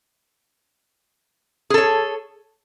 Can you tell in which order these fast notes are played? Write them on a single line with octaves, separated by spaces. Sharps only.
G#4 A4 C#5